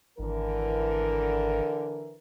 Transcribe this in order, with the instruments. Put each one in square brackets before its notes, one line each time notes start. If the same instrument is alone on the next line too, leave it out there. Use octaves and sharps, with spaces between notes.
[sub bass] G#1 [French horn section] D3 E3 A#4